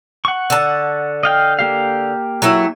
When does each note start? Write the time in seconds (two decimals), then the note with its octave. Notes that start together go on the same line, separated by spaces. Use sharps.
0.25 F#5 C#6
0.50 D3 A5
1.23 D#5 F5 G5
1.59 A#3 G4 F5
2.42 F#3 A3 E4